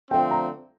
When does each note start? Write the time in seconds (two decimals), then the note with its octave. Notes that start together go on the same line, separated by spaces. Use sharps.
0.11 D3 F3 A3 C4 G5
0.31 A#5